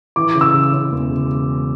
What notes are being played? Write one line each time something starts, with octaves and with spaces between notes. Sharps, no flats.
E3 D6
C#3
E6
C#3
C#3
E1
C#3